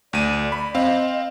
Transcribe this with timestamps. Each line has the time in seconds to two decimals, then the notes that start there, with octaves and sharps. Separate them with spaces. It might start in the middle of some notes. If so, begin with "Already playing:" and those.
0.13 D2 D5 D#7
0.52 B5
0.75 C4 D#5 F5